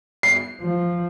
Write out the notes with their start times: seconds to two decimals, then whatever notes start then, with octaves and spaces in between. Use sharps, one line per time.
0.23 C7
0.61 F3